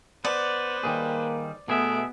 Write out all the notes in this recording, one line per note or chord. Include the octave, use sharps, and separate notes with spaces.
B3 B4 C5 D5
D#3 G3 A#3 G#4
B2 A3 B3 G#4 E5 D7